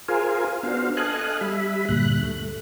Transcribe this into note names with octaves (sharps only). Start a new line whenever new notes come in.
F4 G#4 A#4 C5 F5 G#5
B3 D4 F#4 C5 F5
A4 D#5 F5 G#5 F#6
G3 E5 B5
D2 G2 A#2 F#6
A3